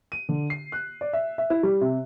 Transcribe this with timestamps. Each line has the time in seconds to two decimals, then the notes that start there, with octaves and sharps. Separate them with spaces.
0.12 D#7
0.29 D3
0.50 C7
0.72 F#6
1.01 D5
1.13 E5
1.38 E5
1.50 E4
1.63 G3
1.81 C3